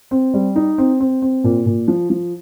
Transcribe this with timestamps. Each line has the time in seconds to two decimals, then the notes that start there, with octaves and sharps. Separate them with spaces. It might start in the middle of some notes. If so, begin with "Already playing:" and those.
0.11 C4
0.34 G3
0.56 D#4
0.78 C4
1.00 C4
1.22 C4
1.44 A#2
1.66 A#2
1.88 F3
2.10 F3